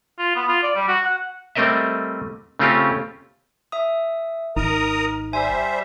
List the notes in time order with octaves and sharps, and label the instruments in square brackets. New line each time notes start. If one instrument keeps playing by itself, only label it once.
[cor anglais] F4
B3
F4
D5
G3
F#4
F#5
[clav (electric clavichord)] G3 A3 C4 A#4 D#5 E5
C#3 A3 C4 C#4 F4 G4
[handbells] E5 D#6
[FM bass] G#1 [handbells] D#4 [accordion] A#4 A#5 D#6
[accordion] G3 C5 E5 [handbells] G#5